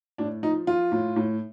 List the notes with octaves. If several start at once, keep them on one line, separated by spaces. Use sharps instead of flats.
A2 D4
F3 D#4
F3 F4
A2
A2